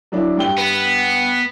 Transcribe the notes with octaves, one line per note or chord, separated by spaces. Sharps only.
F#3 D4 E4
G2 G5 G7
B3